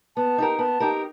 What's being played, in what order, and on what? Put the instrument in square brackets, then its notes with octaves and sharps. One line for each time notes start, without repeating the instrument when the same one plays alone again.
[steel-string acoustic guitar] B3 [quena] A5
[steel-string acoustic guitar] D#4 G4 A#4
[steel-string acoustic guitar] B3 [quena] A5
[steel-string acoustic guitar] D#4 G4 A#4